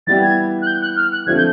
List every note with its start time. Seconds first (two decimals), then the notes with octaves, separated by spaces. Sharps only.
0.07 E3 G3 B3 E4 G4 A6
0.22 G#6
0.62 F#6
0.66 G6
0.82 F#6
0.96 F6
1.12 F#6
1.26 D3 F3 A3 C4 F4 G#6
1.37 G6